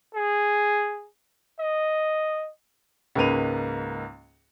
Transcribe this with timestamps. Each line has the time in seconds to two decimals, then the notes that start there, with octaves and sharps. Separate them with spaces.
0.15 G#4
1.60 D#5
3.15 C#2 G#2 A#3 B4 D#7 F7